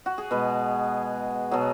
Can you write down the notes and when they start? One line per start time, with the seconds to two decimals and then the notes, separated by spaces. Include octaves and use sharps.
0.06 F#4
0.18 G#4
0.31 B2 G#3 B4
1.51 B2 F#3 G#4